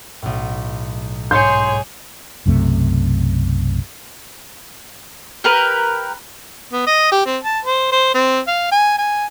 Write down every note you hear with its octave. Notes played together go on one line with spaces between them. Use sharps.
B1 A2
G#2 G#4 C#5 C6 G6 C#7
B1 F#2 C3 A3
G4 A#4 B4
B3
D#5
G4
C4
A5
C5
C5
C4
F5
G#5
G#5